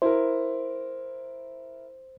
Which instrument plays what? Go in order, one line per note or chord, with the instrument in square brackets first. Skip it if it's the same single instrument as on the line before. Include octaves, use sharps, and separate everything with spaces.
[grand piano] E4 A#4 [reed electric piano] C5